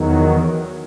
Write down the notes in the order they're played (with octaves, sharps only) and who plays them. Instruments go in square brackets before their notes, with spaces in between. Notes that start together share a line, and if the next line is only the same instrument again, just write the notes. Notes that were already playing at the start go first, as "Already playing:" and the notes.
Already playing: [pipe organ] E2 D#3 F#3